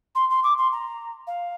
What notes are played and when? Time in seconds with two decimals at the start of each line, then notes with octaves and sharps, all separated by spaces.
0.15 C6
0.30 C6
0.44 D6
0.58 C6
0.72 A#5
1.27 F5